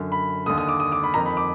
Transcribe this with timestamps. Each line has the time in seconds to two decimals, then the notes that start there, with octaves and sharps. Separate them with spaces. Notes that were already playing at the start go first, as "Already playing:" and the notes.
Already playing: F#2 D3
0.12 B5
0.46 D#2 D3 D#6
0.58 D#6
0.69 D6
0.80 D#6
0.92 D6
1.04 B5
1.14 F2 D#3 A#5
1.26 B5
1.37 D6